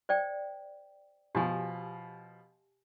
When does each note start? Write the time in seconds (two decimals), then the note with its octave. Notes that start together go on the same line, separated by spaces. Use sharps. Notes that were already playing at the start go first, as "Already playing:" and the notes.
0.09 C5 D5 G5
1.35 B2 F3 G4 G#5